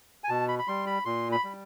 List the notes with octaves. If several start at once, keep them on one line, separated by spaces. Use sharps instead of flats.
G#5
B2 A5
B5
B5
G3 C6
B5
A#2 C6
B5
G3